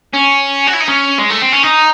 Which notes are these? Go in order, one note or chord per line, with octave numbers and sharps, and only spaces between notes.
C#4
F#4
E4
D#4
C#4
G#3
A3
C4
C#4
D#4